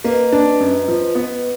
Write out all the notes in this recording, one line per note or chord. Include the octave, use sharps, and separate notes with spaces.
A#3 B4 D#5
D4
F#2
F3
B3